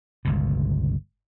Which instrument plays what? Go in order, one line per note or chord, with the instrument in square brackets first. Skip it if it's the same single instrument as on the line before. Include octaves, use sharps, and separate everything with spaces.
[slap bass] G1 C#2 B2